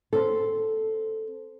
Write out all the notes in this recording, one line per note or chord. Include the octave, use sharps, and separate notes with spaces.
C4 A4